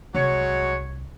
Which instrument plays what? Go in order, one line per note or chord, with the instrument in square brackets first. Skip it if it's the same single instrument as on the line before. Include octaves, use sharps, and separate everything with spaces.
[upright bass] C2 [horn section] F#3 G#3 C#5